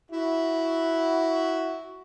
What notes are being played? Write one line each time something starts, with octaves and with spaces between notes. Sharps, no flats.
E4 F#4